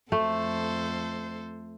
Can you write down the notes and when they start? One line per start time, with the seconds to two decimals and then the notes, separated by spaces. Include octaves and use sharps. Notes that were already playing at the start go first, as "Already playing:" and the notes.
0.12 F2 A3 A4 C5